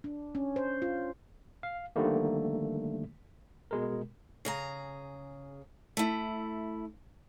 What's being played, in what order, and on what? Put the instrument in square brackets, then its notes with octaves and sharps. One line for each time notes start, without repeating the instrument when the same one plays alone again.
[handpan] D4
C#4
C5
F4
[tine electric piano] F5
D3 D#3 F3 G3 A3 A#3
B2 G#3 A#4
[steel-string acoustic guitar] C#3 G#4 A#5
A3 E4